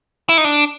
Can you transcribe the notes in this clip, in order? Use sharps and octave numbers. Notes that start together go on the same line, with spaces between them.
E4
D#4
D4